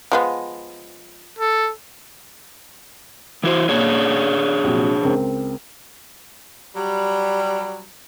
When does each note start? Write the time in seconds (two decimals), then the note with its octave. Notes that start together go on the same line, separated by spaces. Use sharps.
0.12 F3 G#3 B3
1.39 A4
3.44 E3 E4 F#4 C5
3.69 A#2 D4 G#4 C#5
4.64 A#1 C3 F#3
5.03 C#2 C4 A#4
6.76 F#3 G3